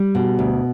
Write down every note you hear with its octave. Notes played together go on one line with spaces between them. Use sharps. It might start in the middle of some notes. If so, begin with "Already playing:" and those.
Already playing: G3
B2
D2